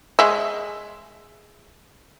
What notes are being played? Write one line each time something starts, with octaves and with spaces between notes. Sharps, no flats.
G#3 E5